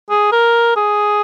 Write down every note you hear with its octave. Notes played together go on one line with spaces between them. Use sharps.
G#4
A#4
G#4